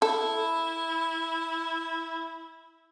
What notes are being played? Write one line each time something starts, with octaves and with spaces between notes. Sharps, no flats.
E4 A4